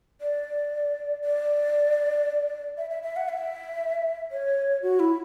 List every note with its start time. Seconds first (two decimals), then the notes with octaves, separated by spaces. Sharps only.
0.21 D5
1.24 D5
2.78 E5
2.90 E5
3.03 E5
3.16 F#5
3.29 E5
4.32 C#5
4.82 F#4
5.00 E4